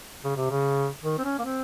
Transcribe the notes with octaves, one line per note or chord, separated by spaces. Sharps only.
C#3
C3
C#3
D#3
C4
C#4
A#3
C4